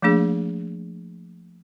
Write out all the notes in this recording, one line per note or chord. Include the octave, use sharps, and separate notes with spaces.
F3 A3 A#3 D4 G#4